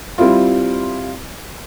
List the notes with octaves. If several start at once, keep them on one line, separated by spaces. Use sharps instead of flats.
G3 C4 E4 F4